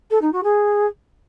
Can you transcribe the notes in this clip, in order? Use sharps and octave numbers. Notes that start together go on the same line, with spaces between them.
A4
D#4
F#4
G#4